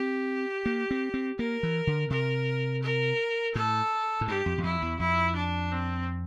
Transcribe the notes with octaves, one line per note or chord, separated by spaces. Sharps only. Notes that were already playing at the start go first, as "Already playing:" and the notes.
Already playing: C4 G4
A#3
C4
C4
A#3 A#4
E3
D3
C3 A#4
A#4
A2 A4
A2
G2 G4
F2
E2
F2 E4
E2
F2 E4
D4
C4